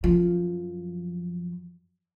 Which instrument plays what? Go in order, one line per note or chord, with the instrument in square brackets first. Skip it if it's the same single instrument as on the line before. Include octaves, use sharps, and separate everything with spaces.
[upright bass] F#2 F3